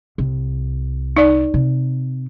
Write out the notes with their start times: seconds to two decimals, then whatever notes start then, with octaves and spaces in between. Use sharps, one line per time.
0.18 C2
1.16 D#4 D5
1.54 C3